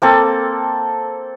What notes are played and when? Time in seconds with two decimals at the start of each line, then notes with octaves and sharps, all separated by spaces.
0.02 A#3 C4 A4